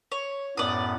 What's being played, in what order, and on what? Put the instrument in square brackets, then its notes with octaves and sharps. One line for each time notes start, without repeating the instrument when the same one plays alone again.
[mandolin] C#5
[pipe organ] F#2 A2 B3 [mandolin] D5 D#6